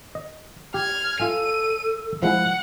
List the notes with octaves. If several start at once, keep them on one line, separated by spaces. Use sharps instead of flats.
D#5
G4 F6 G#6
F4 A4 E5 G#5 D#7
F3 G#3 E4 F#5